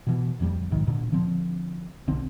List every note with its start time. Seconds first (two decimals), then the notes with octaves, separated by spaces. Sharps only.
0.07 B2 E3
0.40 D1 F2 F#3 G3
0.71 A#1 G#2 D#3
0.87 D1 A#2 D3
1.12 D3 F3 C4
2.07 B1 D3 C4